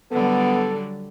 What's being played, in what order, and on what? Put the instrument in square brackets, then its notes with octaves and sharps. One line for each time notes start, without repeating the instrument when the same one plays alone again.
[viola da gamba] D3 F#3 G3 [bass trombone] B3 [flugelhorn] A4